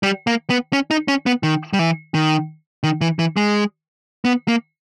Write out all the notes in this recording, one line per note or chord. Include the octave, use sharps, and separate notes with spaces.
G3
A#3
B3
C#4
D#4
C#4
B3
D#3
G3
E3
D#3
D#3
E3
E3
G#3
B3
A#3